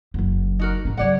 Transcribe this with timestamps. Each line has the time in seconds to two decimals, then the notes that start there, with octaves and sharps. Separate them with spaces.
0.14 F#1 F#2
0.59 D#4 F#4 A#4
0.85 G#2 C#4
0.97 C#3 F#3 C#5 D5 F#5